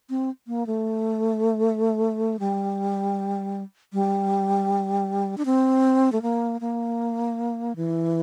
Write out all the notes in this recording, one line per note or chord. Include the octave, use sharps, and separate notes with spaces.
C4
A#3
A3
G3
G3
D4
C4
A3
A#3
A#3
E3